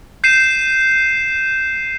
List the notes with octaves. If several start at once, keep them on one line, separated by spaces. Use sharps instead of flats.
G6 C7 D#7 E7